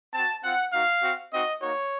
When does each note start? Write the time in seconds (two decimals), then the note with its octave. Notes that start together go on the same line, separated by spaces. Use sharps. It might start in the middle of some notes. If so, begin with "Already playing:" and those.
0.14 C4 F#4 A5
0.43 C4 F4 F#5
0.73 A#3 D#4 F#4 F5
1.02 C4 F#4
1.32 C4 D#4 F#4 D#5
1.61 A#3 D#4 F#4 C#5